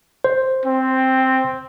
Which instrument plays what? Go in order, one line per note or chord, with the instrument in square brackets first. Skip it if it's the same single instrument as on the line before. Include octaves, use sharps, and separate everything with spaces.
[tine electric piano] C5
[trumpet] C4